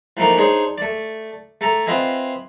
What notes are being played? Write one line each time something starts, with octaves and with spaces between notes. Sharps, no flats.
E3 F3 A3 A#3 D#4
D4 D#4 G#4 C5 C#5
A3 D5
A3 A4 A#5
C4 F4 B4 D#5 E5 G#5